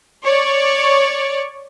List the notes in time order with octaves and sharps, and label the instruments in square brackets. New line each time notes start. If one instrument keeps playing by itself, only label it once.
[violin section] C#5 D5 C#6